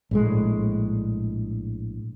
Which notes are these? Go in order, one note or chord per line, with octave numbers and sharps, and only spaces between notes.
A#1 A2 G#3